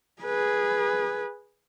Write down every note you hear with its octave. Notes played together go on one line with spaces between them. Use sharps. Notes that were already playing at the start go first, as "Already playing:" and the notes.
G#4 B4